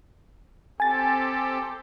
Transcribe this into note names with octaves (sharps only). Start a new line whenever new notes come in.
C4 G4 A4 G#5 A6